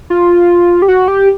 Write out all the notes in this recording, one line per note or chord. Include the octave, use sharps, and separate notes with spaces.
F4
G4
F#4
G4